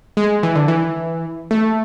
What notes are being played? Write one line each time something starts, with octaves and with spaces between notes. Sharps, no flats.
G#3
E3
D3
E3
A3